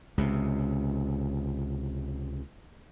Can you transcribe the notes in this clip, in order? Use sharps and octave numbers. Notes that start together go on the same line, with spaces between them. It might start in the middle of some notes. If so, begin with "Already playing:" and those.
C#2 C3